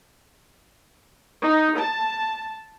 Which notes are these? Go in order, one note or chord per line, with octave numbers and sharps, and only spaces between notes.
D#4
A5